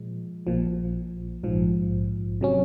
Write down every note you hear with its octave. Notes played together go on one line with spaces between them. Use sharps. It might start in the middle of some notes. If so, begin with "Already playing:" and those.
Already playing: A#2 F3 G#3
A#1 A#2 F3
A#1 G#2 F3
C3 F#3 C#4